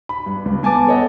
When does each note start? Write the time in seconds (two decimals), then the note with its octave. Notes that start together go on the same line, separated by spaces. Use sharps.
0.09 B5
0.26 G2
0.45 C#2
0.63 B3 G#5 A5 D6 A6
0.87 A4 C#5 D#5 F#5